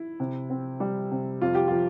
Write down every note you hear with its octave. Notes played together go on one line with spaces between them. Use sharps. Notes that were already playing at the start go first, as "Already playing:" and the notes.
Already playing: E4
C3
C4
G3
C3
F2 F4
G4
F3 F4